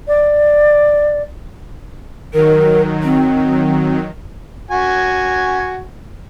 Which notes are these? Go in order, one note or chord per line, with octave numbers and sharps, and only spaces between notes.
D5
D#3 F#3 A#4
C4
F#4 G#5